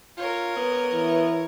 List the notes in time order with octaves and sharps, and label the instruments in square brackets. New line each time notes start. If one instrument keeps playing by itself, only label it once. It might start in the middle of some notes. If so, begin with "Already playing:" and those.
[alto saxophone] F4 [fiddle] A#4 C#5
[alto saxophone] B3
[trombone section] E3 E4